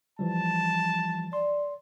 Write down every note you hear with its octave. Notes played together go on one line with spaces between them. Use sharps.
E3 F3 G3 A5
D5 C6